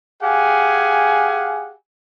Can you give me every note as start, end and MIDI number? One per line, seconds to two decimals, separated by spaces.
0.23 1.74 67
0.23 1.74 68
0.23 1.74 77
0.23 1.74 78
0.23 1.74 80